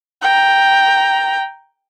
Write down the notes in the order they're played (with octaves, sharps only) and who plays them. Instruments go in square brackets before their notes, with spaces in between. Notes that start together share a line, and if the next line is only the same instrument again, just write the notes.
[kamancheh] G5 A#5